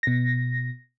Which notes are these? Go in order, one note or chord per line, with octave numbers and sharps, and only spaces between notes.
B2 A#6